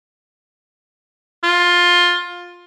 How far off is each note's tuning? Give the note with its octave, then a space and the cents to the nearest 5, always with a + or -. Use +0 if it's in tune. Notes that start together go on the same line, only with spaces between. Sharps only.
F4 +15